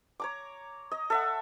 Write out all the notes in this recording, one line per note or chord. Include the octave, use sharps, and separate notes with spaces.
C#5 A#5 D6
D#5
A4 E5 F#5